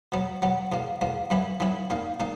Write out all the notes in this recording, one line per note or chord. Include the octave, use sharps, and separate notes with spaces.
B2 F#3 B3
B2 F#3 B3
E2 B2 A#3
E2 B2 A#3
F#2 E3 B3 E4
F#2 E3 B3 E4
A#2 A#3 D#4
A#2 A#3 D#4